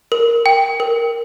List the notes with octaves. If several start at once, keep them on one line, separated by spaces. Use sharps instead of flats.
A#4
G5
A#4